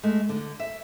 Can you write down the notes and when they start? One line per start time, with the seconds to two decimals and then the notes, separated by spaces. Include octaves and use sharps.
0.03 G#3 A3
0.29 D3
0.60 E5